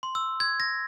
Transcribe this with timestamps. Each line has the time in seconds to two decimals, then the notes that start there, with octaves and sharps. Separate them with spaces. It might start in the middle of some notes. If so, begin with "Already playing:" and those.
0.03 C6
0.15 E6
0.40 G#6
0.60 A#6